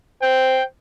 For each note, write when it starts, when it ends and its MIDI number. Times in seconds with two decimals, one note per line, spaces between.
0.22 0.61 72
0.22 0.64 79